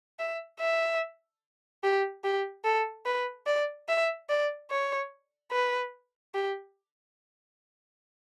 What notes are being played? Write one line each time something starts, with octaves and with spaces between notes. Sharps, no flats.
E5
E5
G4
G4
A4
B4
D5
E5
D5
C#5
B4
G4